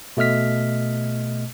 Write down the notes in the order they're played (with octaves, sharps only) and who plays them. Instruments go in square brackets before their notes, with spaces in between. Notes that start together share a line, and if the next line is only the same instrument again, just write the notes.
[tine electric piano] B2 A3 D#5 F6 B6